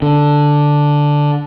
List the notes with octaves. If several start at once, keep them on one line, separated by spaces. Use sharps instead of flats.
D3